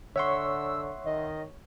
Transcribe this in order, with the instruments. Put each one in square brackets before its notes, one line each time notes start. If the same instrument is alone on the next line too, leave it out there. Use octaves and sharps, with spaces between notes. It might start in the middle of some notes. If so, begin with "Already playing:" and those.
[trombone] D3 [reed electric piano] C#5 C#6 [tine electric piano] E5 F#5 C6 [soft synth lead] E6
[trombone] D#3 [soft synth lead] D#5